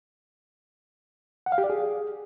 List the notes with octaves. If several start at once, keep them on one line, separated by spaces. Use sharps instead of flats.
F#5
F5
G4
D5
G#4